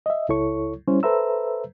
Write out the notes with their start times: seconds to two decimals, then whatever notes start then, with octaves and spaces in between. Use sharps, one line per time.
0.06 D#5 E5
0.29 C#2 E4 A4 C#5 C#6
0.88 G3 C#4 E4 C5 C#5
1.03 A4 B4 C5 E5 A#5 E6